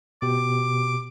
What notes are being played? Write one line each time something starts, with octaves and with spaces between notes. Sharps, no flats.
B2 G4 D6